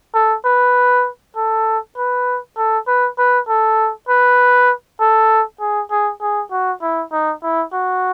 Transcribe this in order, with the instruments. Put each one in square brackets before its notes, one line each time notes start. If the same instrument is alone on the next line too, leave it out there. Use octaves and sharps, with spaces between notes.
[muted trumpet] A4
B4
A4
B4
A4
B4
B4
A4
B4
A4
G#4
G#4
G#4
F#4
E4
D#4
E4
F#4